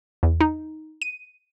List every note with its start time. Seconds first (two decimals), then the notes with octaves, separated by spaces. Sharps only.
0.23 E2
0.40 D#4
1.02 D#7